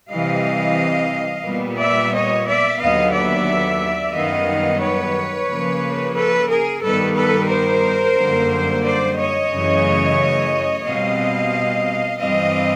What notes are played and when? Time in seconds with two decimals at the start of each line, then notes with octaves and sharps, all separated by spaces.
0.10 C3 E3 G3 D#5 F5
1.45 A#2 G3 B3
1.78 D5 E5
2.12 C#5 D#5
2.45 D5 E5
2.79 D#2 D3 F#3 B3 D#5 F5
3.13 D5 E5
4.13 F#2 D#3 G3 B3 D#5 F5
4.81 B4 C#5
5.48 C#3 F3 A#3
6.15 A4 B4
6.49 G#4 A#4
6.82 G2 D#3 G3 B3 A4 B4
7.15 A4 B4
7.49 A#4 C5
8.17 F#2 D3 G3 A#3
8.84 C5 D5
9.17 C#5 D#5
9.51 F#2 C#3 E3 A3
10.85 B2 G3 C4 D#5 F5
12.19 G2 E3 G3 C4 D#5 F5